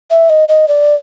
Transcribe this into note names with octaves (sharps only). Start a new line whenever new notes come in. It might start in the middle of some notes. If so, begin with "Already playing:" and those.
E5
D#5
D#5
D5